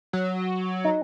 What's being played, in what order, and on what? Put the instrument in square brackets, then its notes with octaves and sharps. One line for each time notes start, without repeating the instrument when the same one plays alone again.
[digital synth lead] F#3
[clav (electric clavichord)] D#4